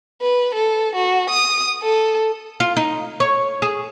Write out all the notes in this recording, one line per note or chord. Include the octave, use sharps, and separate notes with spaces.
B4
A4
F#4
D#6
A4
F4
D#4
C#5
G#4